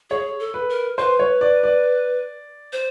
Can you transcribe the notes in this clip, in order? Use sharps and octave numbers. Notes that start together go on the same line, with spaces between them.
G#4 C#5
A4
B4
A#4
B4 C5
C#5
D5
D5
C5